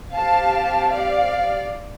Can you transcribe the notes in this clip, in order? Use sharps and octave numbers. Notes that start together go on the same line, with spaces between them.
C4 G4 F5 A5
D5 F5